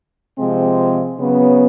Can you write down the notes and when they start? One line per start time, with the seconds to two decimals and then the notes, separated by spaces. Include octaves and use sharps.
0.39 C3 F3 G#3 C4
1.19 C#3 F#3 B3